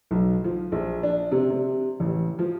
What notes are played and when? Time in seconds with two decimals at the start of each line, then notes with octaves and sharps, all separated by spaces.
0.11 B1
0.44 F3
0.72 A#1
1.03 D4
1.32 C3
1.50 C3
2.00 A1
2.39 F3